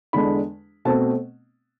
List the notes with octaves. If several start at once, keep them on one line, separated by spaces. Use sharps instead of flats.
E2 D3 G#3 D4 B5
B2 A3 C4 A5